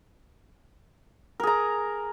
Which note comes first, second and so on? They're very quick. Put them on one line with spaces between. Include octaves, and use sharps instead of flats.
A#4 G#4 A#5